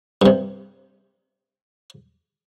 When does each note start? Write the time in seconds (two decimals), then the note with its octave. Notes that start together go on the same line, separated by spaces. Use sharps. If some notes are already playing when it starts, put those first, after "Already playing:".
0.22 G2 C3